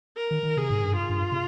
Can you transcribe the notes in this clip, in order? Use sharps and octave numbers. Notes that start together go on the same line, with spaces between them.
A#4
D#3
D#3
C3 G#4
G#2
G2
F4
G2
C3